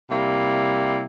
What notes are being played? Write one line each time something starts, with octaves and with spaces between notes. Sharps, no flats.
C3 G3 A#3 E4